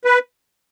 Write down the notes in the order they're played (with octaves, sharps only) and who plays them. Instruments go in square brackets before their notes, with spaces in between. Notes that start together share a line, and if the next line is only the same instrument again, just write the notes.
[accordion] B4